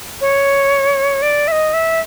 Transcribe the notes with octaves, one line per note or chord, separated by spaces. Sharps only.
C#5
D5
E5
D#5
E5